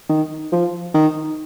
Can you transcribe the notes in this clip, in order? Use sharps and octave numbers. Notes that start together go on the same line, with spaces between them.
D#3
F3
D#3